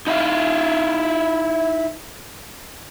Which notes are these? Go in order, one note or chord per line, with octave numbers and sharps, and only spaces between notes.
D#4 E4 E5 F5